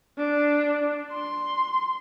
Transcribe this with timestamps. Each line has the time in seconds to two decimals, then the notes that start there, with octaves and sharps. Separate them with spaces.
0.18 D4
1.12 C6